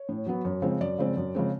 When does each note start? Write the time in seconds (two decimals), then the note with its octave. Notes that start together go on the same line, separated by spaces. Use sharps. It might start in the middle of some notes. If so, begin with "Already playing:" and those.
Already playing: C#5
0.09 A2
0.26 F#3 B3
0.45 F#2
0.62 C#3 F3 G#3 C4
0.80 F#2 D5
0.98 C#3 F3 G#3 C4
1.17 F#2
1.35 C#3 F3 G#3 C4